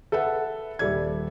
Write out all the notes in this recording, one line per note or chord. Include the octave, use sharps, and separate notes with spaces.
A4 B4 E5 F#5
D#1 G3 A4 D5 E5 G#6